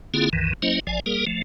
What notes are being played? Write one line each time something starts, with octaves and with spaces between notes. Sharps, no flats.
D3 A#3 C4 E4 F4 G#4
C2 F#2 D#3 E3
F#3 A#3 C#4 E4 C5 D#5
A1 F3 D5 G#5
G3 A#3 G#4 A#4
F3 A3